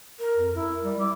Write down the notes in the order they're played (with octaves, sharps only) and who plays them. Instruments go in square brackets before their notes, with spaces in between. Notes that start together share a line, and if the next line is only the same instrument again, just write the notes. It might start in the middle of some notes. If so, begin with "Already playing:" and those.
[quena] A#4
[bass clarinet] F2
E4
[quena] A#4
[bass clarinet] G3
[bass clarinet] E4 [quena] D6